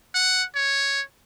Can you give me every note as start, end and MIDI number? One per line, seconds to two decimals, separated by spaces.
0.15 0.44 78
0.55 1.02 73